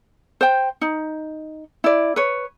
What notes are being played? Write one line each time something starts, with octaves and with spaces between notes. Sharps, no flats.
C5 G5
D#4
E4 D5
B4 C#5